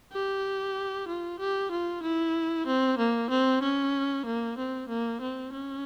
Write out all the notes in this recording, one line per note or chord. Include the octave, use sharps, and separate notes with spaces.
G4
F4
G4
F4
E4
C4
A#3
C4
C#4
A#3
C4
A#3
C4
C#4